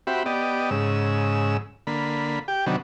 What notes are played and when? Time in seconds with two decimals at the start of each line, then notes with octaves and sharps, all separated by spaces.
0.07 C4 F#4 G4 E5 B5
0.26 B3 G4 D5 D#5
0.71 G#2 C#3 E6
1.87 D3 A#3 B5
2.48 G4 G5
2.66 C3 D#3 F#3 B3 D4